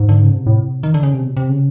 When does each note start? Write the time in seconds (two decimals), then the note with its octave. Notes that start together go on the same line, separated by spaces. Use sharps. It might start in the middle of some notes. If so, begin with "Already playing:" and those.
Already playing: G#2
0.09 D3
0.22 C#3
0.34 C3
0.46 A2
0.83 D#3
0.94 D3
1.03 C#3
1.14 C3
1.23 B2
1.37 C3
1.49 C#3